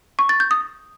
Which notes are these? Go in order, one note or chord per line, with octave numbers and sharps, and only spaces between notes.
C#6
A6
G6
D#6